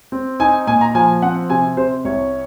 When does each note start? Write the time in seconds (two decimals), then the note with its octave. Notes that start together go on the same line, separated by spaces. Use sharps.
0.12 C4
0.40 D#4 G#5
0.67 A#2 G#5
0.81 A#5
0.95 F3 G#5
1.22 C4 F#5
1.50 C3 G#5
1.77 C3 C5
2.05 C2 C#5